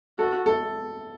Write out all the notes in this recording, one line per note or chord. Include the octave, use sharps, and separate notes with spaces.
F#4 A4
A4